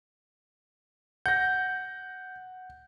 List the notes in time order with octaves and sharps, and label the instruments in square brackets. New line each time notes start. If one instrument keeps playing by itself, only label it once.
[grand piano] F#5 A#6 [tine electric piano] G6